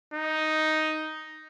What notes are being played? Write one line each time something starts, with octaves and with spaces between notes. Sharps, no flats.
D#4